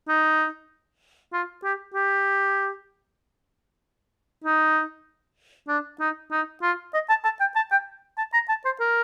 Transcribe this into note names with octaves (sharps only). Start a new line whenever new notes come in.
D#4
F4
G4
G4
D#4
D4
D#4
D#4
F4
D#5
A5
A5
G5
A5
G5
A5
A#5
A5
C5
A#4